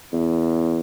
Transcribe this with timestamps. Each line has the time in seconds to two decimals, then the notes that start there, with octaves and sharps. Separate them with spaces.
0.13 E2